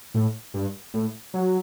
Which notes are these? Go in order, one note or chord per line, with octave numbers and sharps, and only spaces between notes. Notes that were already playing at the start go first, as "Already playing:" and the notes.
A2
G2
A2
F#3